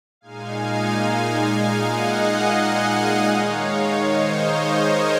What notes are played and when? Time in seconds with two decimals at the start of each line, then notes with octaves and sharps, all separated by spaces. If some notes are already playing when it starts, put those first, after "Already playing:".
0.21 A#2 G#3 D#4 F5 G#5
1.74 D#5 F#5
3.25 D#3 G#3 D#4 C#5 F5
4.02 C5 D#5
4.79 A#4 C#5